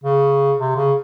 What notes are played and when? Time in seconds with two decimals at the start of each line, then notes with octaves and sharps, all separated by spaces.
0.04 C#3
0.58 C3
0.76 C#3